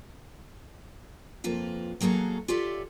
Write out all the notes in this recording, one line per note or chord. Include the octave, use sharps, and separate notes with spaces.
F2 A#3 F4 B4
F#3 A#3 F#4 G#4 A4
F4 G4 A4 C#5 D5 E5